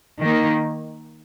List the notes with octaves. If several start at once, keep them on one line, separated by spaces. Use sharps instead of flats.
D#3 A#3 D#4